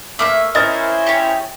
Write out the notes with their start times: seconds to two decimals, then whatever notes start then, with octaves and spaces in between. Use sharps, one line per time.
0.19 A3 A#3 E5 D6 F6
0.55 C#4 E4 A#4 C5 D#5 A6
1.07 G4 C#5